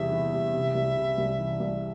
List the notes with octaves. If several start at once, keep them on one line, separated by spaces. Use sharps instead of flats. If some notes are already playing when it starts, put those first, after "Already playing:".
Already playing: E2 C3 E3 G3 E5
E3
G3
C3
C2
C3
C2
E3
C2